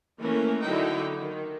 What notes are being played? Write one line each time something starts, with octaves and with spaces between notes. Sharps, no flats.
E3 A3 A#3 C#4 A#4
D3 F#3 D#4 E4 G5
D#3